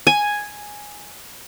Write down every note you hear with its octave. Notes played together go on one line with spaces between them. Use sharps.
G#5